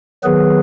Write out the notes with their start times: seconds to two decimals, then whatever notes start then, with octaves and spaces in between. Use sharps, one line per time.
0.24 D#3 F#3 B3 G#4 B4